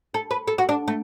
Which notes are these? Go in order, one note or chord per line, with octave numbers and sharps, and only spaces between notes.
A4
B4
A4
F#4
D4
A3